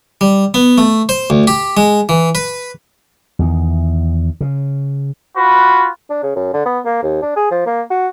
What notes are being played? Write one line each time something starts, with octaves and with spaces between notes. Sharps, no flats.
G3
B3
A3
C5
D2
G4
G#3
E3
B4
E2 D#3
C#3
F4 F#4 B4
D4
C#3
F#2
D3
B3
A#3
D#2
D4
G#4
F3
A#3
F#4